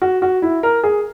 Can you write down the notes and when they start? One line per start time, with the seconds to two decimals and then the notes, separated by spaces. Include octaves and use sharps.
0.02 F#4
0.22 F#4
0.42 E4
0.63 A#4
0.84 G#4